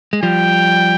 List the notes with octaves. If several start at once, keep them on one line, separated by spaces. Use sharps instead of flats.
G#3
F3 G3 G5